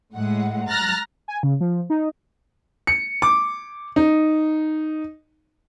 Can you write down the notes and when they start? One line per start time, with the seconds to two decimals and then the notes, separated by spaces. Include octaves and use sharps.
0.15 A2 G#3 F#5
0.68 A#5 F6 F#6 A6 A#6
1.28 G#5
1.43 C#3
1.61 F3
1.90 D#4
2.87 C#7
3.22 D6
3.96 D#4